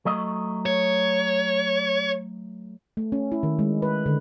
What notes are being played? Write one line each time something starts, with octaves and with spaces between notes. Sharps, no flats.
F#3 A3 D#5
C#5
A3
C#4
E4
D#3
G#3
B4
D3